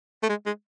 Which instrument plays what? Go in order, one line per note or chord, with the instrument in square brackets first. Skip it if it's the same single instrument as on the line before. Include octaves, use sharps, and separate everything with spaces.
[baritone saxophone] A3
G#3
G#3